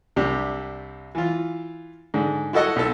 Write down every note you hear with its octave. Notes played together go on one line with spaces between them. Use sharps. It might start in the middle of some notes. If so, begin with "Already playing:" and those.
C2 C3 D4 G4
E3 F4
G#2 D3
E4 F#4 A4 D#5 F#5
B1 A4